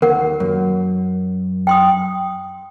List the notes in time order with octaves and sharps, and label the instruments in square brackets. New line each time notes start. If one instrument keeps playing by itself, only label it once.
[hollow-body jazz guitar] D#2 [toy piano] A#4 F#5
[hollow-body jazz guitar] F#2
[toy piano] G5 C6 D#6